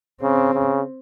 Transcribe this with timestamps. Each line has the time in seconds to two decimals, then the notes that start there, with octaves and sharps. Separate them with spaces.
0.22 C#3 C4
0.54 C#3